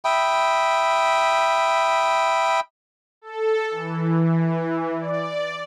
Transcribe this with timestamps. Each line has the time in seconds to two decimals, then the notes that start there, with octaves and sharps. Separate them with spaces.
0.05 E5 G5 B5 D#6
3.22 A4
3.70 E3
4.97 D5